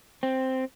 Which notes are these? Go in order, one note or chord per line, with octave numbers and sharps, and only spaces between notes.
C4